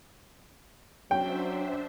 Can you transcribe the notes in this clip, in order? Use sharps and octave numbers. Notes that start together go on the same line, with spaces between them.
F#3 C#4 D4 C5 E5 G5